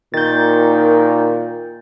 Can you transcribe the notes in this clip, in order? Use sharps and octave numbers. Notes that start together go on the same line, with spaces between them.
A#2 D#3 G6 A6